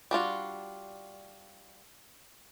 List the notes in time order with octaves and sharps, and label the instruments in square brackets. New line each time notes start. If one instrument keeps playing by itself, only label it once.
[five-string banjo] G3 D4 F4 F#4